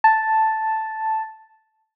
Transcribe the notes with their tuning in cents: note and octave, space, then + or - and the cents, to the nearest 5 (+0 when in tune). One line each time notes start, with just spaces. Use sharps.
A5 +0